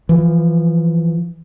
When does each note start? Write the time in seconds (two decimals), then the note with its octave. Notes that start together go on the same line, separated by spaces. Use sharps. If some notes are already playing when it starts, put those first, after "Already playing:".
0.09 E3 F3